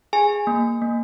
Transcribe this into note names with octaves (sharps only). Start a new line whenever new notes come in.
G#4 G#5
A#3
A#3